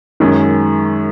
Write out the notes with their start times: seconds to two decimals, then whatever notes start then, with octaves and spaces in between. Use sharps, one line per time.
0.20 F#2 D#3 G#3 C#4